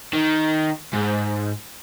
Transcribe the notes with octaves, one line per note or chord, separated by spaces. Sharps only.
D#3
G#2